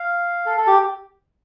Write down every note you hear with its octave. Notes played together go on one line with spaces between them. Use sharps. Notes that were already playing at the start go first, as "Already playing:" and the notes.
Already playing: F5
A4
A4
G4